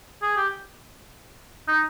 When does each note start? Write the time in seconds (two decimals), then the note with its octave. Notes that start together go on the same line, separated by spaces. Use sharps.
0.22 G#4
0.37 G4
1.68 D#4